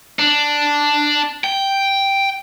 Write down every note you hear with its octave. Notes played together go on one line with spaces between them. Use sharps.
D4
G5